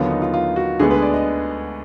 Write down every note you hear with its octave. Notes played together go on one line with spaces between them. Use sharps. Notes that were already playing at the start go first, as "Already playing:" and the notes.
Already playing: D#2 D3 F#3 B3 F4
D#4
F4
F4
F#4
D2 D3 G#3 B3 G#4
B4
D5
D#5